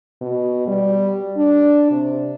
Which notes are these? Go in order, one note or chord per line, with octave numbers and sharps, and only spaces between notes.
B2
G3
D4
C3